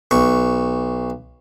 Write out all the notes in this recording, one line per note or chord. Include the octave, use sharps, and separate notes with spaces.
B1 C#6